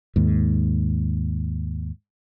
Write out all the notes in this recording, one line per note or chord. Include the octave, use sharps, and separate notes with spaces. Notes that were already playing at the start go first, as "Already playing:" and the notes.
D#2 G#2